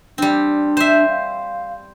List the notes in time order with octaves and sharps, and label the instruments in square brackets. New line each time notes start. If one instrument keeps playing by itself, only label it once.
[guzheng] G3 C4 [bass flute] D4
[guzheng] C5 E5
[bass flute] F5